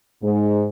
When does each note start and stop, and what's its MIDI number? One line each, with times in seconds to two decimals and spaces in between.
0.23 0.69 44